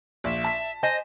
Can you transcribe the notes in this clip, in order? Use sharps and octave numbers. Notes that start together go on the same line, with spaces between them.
A#1 E5
A5 B6
C5 D#5 G#5 A#6